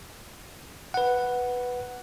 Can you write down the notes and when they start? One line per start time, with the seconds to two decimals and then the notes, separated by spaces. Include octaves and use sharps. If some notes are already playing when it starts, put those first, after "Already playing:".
0.94 B4 F#5